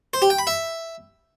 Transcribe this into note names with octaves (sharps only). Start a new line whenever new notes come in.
C5
G4
G5
B5
E5